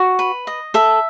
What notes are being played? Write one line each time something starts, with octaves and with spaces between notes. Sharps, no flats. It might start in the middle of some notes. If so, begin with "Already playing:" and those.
Already playing: F#4
B4
D#5
A4 E5